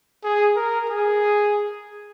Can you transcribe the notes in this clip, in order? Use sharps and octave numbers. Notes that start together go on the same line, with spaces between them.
G#4
A#4
G#4